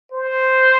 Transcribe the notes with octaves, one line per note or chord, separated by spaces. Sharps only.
C5